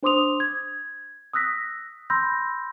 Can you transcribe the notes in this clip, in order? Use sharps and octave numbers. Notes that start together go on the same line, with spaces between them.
D4 C5 C6 D6 D#6 F7
G#6
D#6 E6 F#6 A#6 B6
B5 C6 E6 G6 A#6